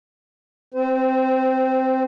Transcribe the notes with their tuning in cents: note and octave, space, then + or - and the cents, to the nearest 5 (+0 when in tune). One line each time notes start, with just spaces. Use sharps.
C4 +0 C5 -25